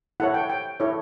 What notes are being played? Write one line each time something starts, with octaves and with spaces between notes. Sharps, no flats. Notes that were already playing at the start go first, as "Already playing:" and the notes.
E4 A4 C#5 F#5
G5
G5
E4 A4 C#5